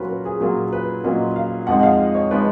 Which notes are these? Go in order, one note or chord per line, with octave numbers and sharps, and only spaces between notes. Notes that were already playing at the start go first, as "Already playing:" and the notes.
Already playing: A#2 F#3 A#3 C#4 F4 B4 C#5
A#4
G#4
A#2 F#3 A#3 C#4 F4
B4
A#2 F#3 A#3 C#4 F4 D#5
F5
F2 F3 G#3 D#4 F#5
F#5
F5
D#5
C#5
F3 G#3 D#4 B4